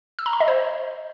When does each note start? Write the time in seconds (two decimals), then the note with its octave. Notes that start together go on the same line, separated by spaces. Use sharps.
0.19 E6
0.26 A#5
0.33 B5
0.40 D#5
0.48 C5